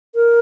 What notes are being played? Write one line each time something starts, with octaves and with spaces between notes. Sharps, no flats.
A#4